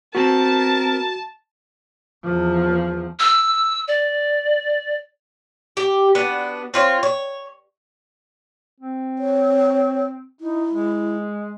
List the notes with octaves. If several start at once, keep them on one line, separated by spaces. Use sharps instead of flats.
B3 C4 F#4 A#4 A5
E2 F3
E6
D5
G4
B3 D4 F#4
C4 F4 C#5
C#5
C4
C#5
D#4 E4
G#3